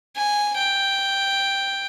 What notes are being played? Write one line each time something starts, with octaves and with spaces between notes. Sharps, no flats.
G#5
G5